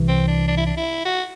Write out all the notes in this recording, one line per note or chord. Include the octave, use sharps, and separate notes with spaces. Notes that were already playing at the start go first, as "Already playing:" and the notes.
Already playing: C2 C3 E3
C4
D4
D4
E4
D4
E4
F#4